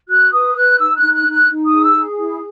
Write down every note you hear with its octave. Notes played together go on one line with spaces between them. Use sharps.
F#4 F#6
B4 D#6
B4 F#6
D#4 E6
F#6
D#4
F#6
D#4
F#6
D#4
D#6
G#4
E6
G#4
E4